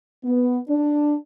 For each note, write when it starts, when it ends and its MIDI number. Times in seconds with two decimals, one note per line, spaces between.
0.25 0.60 59
0.69 1.17 62